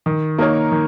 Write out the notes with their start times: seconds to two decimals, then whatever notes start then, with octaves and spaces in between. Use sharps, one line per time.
0.06 D#3
0.38 A#3 D#4 A#4 C#5
0.72 D#3